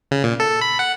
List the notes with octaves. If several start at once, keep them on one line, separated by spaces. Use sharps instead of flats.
C#3
A#2
A4
B5
F#5